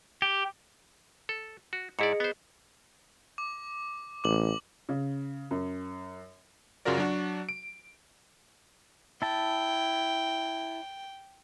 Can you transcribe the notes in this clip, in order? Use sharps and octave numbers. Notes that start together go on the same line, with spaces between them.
G4
A4
F#4
G#2 E4 G#4 D5 D#5 C#7
B3 C5
D6
A1 D6 F#7
C#3
F#2
F#2 C#3 F4 F#4 A#4 D5
F#3 D4 F#4
D7
E4 G5 A5